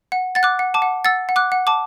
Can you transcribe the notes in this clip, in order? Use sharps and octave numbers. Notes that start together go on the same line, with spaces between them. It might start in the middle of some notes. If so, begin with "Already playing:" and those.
F#5
F#5 A6
D6 F#6
F#5
A5 D6
F#5
F#5 E6 A6
F#5
D6 F#6
F#5
A5 D6